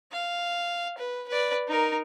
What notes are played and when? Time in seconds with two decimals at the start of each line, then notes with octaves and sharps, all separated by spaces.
0.12 F5
0.97 B4
1.28 B4 D5
1.67 D#4 A#4